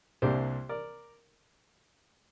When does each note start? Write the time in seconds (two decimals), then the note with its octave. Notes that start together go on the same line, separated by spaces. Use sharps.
0.22 C2 C3 A#3 D4 G4 C5
0.69 A#4 D5